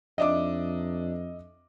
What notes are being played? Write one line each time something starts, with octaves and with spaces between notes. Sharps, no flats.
F2 D4 D#4 D#5 E5 D6